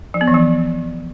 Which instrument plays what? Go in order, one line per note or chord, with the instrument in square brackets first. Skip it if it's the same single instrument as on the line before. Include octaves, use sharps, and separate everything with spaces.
[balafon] F3
B3
E3
F3